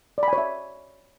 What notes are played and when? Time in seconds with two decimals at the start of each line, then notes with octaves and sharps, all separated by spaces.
0.18 D5
0.23 B5
0.28 G#5
0.33 C#5
0.38 E5